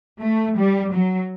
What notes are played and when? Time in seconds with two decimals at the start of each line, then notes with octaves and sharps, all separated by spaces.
0.21 A3
0.58 G3
0.93 F#3